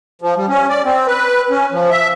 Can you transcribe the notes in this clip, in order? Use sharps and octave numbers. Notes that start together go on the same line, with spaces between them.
F3
G3
C#4
D5
C4
B4
C#4
F3
E5